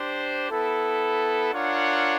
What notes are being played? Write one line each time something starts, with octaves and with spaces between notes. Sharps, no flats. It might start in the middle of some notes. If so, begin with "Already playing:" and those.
Already playing: D4 G4 C5
B3 E4 A4
D4 F4 A#4 C#5 F#5